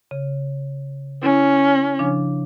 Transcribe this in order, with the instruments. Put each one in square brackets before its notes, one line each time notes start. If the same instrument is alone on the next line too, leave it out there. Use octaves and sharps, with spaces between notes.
[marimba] C#3
[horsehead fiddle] C#4 [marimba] E4
[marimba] C#3 F3 D4